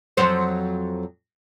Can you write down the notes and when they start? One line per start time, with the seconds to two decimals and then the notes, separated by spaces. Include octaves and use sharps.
0.17 F2 F#3 C5